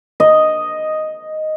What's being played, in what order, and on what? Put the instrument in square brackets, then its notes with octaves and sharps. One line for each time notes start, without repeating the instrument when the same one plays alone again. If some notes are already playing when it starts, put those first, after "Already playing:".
[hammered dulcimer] D#5